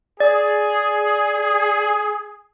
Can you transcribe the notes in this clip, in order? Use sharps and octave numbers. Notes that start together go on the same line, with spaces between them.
G#4 D5